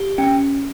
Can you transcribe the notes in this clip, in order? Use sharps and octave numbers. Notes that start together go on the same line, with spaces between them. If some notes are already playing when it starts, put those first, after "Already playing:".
Already playing: G4
C#4 G5